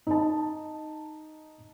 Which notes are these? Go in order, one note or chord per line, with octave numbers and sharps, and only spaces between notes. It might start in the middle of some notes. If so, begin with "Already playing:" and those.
D#4 A5